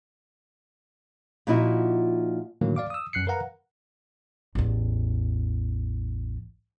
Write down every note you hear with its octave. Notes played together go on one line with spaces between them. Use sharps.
A#2 F3 D#4 E4 F#4
A2 D3 D#3 F#3 A#3
D5 F5 D6
D#6 E6
F#2 F#6 C7 C#7
A#4 B4 F5 F#5 A#5
A1 E2